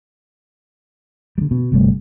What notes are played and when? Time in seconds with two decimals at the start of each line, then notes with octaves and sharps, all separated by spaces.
1.38 D3 G3
1.51 B2
1.72 G1 C3 G3 A3